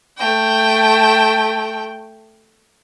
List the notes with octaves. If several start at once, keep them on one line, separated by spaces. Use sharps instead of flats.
A3 G5